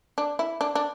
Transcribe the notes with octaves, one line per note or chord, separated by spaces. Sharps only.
D4
E4
D4
D4